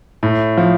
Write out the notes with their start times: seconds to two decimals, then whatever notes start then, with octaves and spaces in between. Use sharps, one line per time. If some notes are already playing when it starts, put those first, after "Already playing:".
0.23 A2
0.57 F3